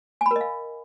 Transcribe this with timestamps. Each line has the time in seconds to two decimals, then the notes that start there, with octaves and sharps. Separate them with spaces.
0.21 G#5
0.26 B5
0.31 A#4
0.36 D#5
0.41 F5